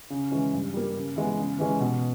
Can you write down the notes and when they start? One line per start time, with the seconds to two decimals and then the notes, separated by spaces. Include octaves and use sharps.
0.10 C#3
0.31 E3 G#3 C#4
0.53 G2
0.74 G3 A#3
0.96 C#3
1.16 E3 G#3 B3
1.38 C#3
1.58 E3 G#3 C#4
1.80 B2